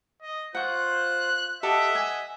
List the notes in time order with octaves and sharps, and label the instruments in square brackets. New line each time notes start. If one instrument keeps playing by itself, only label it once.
[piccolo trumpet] D#5
[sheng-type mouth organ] F4 C5 [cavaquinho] F#5 C#6 [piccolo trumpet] F#6
[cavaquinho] G4 A4 [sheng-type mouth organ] D#5 F#5 [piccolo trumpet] E5
[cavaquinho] G#5